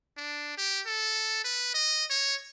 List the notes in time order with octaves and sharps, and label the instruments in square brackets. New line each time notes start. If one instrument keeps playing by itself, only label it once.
[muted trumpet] D4
G4
A4
B4
D#5
C#5